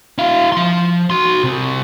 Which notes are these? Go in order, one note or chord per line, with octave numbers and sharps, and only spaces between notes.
E4 F5
F3 C6
F#4 C6
C2 C3